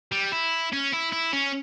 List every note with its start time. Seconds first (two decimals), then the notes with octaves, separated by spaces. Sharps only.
0.12 G3
0.32 E4
0.72 C#4
0.93 E4
1.12 E4
1.33 C#4